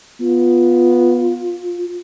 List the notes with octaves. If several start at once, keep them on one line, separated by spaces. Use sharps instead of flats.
B3 F4